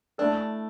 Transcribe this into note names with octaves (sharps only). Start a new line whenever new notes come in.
A3 D4 E4 A4